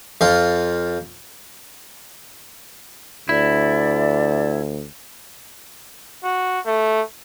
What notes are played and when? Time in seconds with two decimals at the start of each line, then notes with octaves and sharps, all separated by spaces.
0.21 F2 F4
3.29 D2 E4 D5
6.24 F#4
6.66 A3